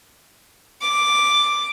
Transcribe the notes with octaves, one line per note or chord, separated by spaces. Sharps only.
D6